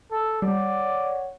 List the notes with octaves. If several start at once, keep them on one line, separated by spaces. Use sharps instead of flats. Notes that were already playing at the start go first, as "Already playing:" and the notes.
A4
G3 C#5 D5 F#5